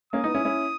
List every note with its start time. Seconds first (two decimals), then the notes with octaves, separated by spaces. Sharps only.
0.13 A#3 C#4 D#6
0.24 B3 D#4
0.34 C#4 E4
0.45 C#4 E4